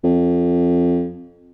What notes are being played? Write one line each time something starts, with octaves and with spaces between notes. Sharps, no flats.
F2